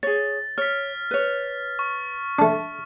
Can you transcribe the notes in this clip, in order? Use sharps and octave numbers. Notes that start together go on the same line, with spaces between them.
G#4 C#5 A6
C#5 F6 B6
B4 C#5
C#6
A3 D4